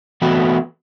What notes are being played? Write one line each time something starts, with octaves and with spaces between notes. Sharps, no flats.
E3 A3 B3 F#4